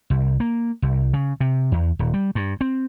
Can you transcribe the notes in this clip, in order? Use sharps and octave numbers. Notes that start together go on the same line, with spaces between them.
C2
A#3
C2
C#3
C3
E2
D#1
G3
G2
C4